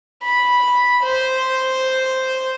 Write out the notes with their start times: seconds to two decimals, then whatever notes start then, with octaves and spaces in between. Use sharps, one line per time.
0.23 B5
1.03 C5